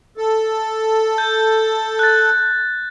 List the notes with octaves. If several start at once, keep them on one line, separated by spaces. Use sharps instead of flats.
A4
G6
F#6 A6